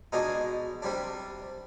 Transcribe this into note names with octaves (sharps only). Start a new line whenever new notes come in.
B2 G#3 D4 D#4
C3 G3 D4